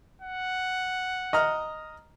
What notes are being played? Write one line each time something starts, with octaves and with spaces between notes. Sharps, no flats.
F#5
D#5 A#5 F6